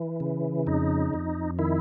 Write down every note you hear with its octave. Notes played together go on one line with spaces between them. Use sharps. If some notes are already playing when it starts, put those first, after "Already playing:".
Already playing: E3
C#3
F2 D#4
F2
D#3 E4